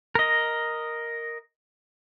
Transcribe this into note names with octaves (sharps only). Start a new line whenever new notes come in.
A#4 D#5